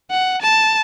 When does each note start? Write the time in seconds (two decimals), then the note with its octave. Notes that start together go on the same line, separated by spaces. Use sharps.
0.11 F#5
0.42 A5